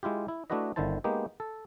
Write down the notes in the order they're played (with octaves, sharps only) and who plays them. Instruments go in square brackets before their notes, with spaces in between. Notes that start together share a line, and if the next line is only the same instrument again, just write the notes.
[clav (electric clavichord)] G#3 E4 F4 G4
E4
A3 D4 E4 F#4 B4 D#5
G1 D3 D#3 E4 C5 A5
G#3 A#3 B3 D#4 G4
A4